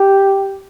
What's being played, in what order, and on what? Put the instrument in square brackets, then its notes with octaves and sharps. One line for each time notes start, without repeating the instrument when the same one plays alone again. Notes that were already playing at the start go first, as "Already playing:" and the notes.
Already playing: [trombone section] G4